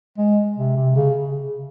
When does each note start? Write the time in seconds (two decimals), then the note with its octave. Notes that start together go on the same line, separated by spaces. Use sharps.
0.18 G#3
0.57 C3
0.77 C3
0.96 C#3